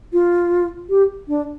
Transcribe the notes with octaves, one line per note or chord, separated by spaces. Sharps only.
F4
G4
D4